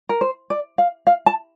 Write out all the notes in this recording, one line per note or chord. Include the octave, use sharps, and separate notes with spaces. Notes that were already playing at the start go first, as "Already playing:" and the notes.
A#4
C5
D5
F5
F5
A5